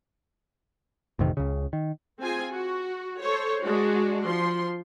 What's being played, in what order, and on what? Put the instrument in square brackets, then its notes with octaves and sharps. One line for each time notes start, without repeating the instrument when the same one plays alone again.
[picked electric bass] A1 F2 C3 D#3
C#2 C#3
D#3
[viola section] C4 F4 G#4 G#5
F#4
A4 C5 C#5
G#3 D4 F#4
F3 C6